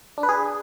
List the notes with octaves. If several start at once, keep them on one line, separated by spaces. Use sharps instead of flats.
D4
B4
G#4